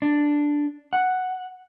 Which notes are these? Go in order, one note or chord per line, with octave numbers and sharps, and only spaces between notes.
D4
F#5